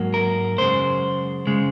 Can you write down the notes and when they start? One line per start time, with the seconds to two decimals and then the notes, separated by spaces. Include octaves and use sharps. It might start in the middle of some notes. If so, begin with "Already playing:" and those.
Already playing: G#2 F#3 A#3
0.14 A#4
0.58 F#2 C#3 G#3 C5
1.47 C#3 G#3